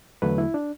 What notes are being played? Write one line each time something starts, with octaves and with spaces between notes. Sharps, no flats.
E2 D3 F#3 A3 B4
E4
D4